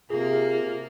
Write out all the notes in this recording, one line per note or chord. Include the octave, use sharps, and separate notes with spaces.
C3 A#3 F4 G#4